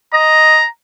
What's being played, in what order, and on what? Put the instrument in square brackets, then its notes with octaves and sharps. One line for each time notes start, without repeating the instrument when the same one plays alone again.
[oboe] D#5 [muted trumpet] A#5